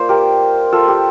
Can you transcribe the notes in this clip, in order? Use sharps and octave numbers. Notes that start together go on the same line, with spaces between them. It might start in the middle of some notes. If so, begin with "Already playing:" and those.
Already playing: A#3 F4 C5 D5
G4 A#4
F4 A4
G4